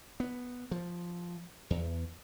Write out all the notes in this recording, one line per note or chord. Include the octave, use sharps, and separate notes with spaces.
B3
F3
E2